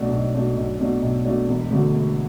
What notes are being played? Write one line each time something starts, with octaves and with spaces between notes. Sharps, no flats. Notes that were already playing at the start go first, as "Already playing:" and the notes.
Already playing: B1 B2 A3 D4 F#4
B1
B2 A3 D4 F#4
B1
B2 A3 D4 F#4
B1
B2 A3 D4 F#4
E1
D2 D3 A3 F#4
E1